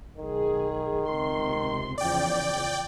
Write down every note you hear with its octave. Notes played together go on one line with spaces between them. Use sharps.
B1 D#3 G#4
C#2 C3 C6
E2 C#3 F3 D5 G5